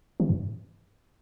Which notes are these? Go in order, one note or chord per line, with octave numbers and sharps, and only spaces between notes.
E3
G2